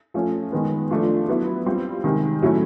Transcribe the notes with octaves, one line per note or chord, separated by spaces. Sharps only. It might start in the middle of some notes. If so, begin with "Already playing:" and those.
F3 A3 C#4
D#3 G#3 B3
F3 A3 D4 F4
F#3 B3 E4
G3 C4 F4
C3 D#3 G#3
A2 F#3 A3 C#4 E4